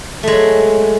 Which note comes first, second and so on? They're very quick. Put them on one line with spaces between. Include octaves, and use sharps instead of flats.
A3 G#3 F#3